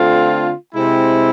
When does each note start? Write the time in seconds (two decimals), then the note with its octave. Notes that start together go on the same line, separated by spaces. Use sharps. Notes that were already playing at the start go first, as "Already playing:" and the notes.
Already playing: D3 A3 C4 F4
0.74 C3 G#3 C4 E4